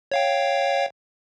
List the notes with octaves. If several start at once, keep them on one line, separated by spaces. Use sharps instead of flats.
C#5 F5 G5